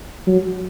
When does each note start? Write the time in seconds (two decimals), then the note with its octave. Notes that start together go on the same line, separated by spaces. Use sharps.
0.27 F#3